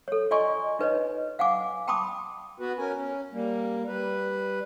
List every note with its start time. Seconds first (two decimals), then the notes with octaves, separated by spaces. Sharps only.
0.08 A4 C#5
0.31 F4 D5 D#5 G#5 C6 C#6
0.79 D#4 B4 C#5 D#5
1.39 F5 F#5 G#5 D6
1.88 G5 A5 B5 C6 D6 D#6
2.60 B3 F#4 B4
2.79 C#4 A#4 G#5
2.96 C#4
3.32 G3 A#3
3.88 G3 B4